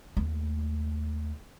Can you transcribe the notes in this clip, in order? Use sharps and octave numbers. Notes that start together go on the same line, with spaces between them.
D#2 A3